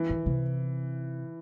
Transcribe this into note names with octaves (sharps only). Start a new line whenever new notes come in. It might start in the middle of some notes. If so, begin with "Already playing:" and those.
Already playing: E3
D#3
C3